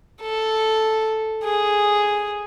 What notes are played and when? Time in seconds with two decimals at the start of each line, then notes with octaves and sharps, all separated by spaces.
0.22 A4
1.44 G#4